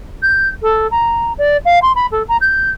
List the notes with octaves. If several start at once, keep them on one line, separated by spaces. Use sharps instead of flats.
G6
A4
A#5
D5
F5
C6
B5
A4
A#5
G6